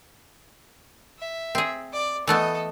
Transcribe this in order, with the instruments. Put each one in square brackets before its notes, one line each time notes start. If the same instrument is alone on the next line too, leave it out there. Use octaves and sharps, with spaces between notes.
[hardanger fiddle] E5
[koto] C4 G#4
[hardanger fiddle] D5
[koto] E3 A3 B3 [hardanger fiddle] A4 D#5